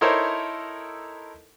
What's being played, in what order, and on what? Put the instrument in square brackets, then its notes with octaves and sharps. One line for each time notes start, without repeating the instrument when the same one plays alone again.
[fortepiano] D#4 E4 A4 A#4 C5 C#5